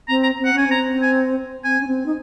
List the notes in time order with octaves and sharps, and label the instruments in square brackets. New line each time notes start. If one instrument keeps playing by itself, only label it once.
[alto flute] C4 [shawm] A#5
[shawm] A#5
[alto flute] C4
[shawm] F#5
[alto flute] C#4 [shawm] G#5
[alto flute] C4 [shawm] A#5
[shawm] G#5
[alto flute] C4 [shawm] G#5
[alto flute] C#4
C4
D#4